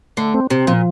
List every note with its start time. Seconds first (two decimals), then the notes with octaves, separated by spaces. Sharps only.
0.17 D3 A3
0.34 C4
0.50 C3 C4
0.67 A#2 F3